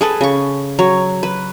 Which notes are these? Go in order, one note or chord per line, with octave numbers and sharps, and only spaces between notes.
G#4 A4 B4
C#3 C#6
F#3 C#5
B4